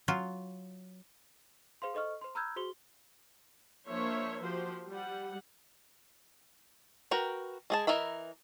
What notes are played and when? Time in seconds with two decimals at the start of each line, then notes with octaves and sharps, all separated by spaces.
0.08 F#3 F4
1.82 G#4 C5 F5 C6
1.94 A4 C5 D#5 C#6 F6
2.21 C5 C6
2.35 A#5 B5 E6 F6 G6 G#6
2.56 F#4 G#4 C5 C6 G7
3.89 F3 A#3 D4 C5 C#5 E5
4.40 F3 F#4 G4 C5
4.89 G3 F#5
7.11 F#4 A#4 B4 G5
7.70 G#3 G#4 A5
7.87 E3 A#4 D#5 E5 B5